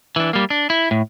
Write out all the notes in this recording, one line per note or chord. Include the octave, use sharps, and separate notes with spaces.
E3 D4
G3 A#3
D4
E4
A2